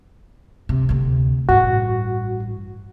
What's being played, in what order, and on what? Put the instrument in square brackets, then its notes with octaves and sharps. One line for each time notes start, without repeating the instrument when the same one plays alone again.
[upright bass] C3
D2 C3
[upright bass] A1 G2 [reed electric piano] F#4